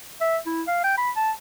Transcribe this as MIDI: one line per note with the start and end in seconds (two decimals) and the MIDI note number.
0.21 0.37 76
0.46 0.62 64
0.68 0.84 77
0.84 0.97 79
0.98 1.11 83
1.16 1.31 81